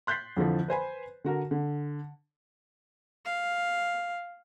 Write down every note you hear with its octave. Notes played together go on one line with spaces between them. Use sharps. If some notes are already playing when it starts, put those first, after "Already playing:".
C6 F#6 G6 A6 B6 C7
F2 D3 E3 F3
B4 C5 G#5 B5
D3 F#4 A#4
D3
F5